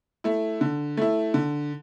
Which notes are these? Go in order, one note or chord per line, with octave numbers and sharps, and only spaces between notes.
A3 E4
D3
A3 E4
D3